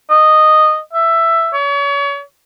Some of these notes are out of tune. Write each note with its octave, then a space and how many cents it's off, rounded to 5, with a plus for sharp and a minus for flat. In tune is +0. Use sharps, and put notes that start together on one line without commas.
D#5 -10
E5 +10
C#5 +35